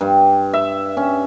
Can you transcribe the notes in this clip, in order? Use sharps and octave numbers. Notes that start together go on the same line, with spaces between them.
G2
E5
C#4